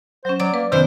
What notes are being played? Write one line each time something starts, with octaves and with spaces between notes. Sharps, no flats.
F#3 C#4 C5
F#3 D5 F#5
A#3 B4
F#2 C3 D#3 B3 C5